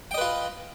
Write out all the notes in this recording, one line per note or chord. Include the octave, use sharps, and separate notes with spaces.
F4 B4 D#5 G5